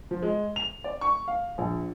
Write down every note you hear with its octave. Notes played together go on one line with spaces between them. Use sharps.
F3
G#3
F7
D5
C#6
F5
A#1